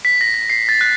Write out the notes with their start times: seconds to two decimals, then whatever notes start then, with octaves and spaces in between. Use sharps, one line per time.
0.05 B6
0.21 A#6
0.34 A#6
0.50 C7
0.69 A6
0.81 F#6